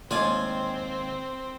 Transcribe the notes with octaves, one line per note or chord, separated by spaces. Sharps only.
D#2 G#2 C4 F4 D5 G#5